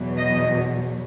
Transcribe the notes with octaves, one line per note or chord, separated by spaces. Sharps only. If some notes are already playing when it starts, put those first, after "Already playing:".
Already playing: E2 B2 F#3
D#5